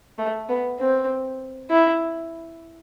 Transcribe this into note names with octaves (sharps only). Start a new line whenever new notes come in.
A3
B3
C4
E4